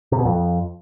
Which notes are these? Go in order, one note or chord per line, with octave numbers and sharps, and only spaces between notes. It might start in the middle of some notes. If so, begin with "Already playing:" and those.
C3
B2
F2